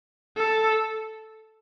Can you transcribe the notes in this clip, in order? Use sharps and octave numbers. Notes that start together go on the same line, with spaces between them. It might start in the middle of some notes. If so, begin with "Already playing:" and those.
A4